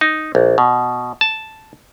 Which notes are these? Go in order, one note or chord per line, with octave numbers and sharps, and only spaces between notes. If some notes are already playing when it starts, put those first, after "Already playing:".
D#4
A#1
B2
A5